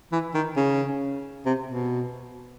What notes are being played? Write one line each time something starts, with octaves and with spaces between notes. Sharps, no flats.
E3
D#3
C#3
C3
B2